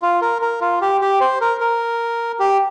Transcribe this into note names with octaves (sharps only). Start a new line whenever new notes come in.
F4
A#4
A#4
F4
G4
G4
C5
A#4
A#4
G4